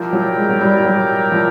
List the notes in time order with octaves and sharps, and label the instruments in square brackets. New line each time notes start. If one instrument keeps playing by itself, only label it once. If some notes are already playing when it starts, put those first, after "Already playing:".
Already playing: [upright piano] F3 [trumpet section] E4 G4 A#4 D5 G5
[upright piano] F#3
G#3
F#3
G3
G3
F#3
F3